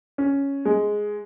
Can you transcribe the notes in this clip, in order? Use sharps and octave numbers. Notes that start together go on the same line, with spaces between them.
C#4
G#3